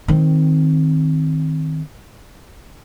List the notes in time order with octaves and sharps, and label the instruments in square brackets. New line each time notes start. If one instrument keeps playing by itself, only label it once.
[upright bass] D#3 C4